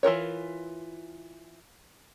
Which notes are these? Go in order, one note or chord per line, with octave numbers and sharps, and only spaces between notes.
E3 F4 A#4 C#5